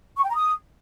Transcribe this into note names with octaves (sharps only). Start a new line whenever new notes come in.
C#6
G5
A#5
D#6